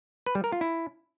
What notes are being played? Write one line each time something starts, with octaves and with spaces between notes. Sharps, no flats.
B4
G3
A#4
F4
E4